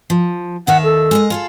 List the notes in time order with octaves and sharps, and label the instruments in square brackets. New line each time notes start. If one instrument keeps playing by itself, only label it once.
[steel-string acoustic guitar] F3
[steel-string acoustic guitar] D#2 D#3 E5 [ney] F#5
[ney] A4
[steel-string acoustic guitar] G#3 A#4 D#5
F4 G#4 A4